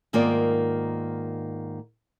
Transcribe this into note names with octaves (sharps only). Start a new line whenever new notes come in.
G#2 D#3 A#3 B3 F4 D5